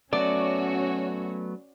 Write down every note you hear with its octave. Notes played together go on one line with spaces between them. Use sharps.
F#3 A3 B3 C#4 F#4 C#5 D5